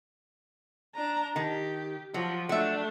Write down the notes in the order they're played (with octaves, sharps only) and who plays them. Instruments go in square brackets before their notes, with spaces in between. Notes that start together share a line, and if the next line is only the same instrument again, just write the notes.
[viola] D4 A#5
[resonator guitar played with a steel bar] D#3 [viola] G4
[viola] F3 [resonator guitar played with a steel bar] F#3
[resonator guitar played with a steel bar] F#3 E5 [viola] A3 D4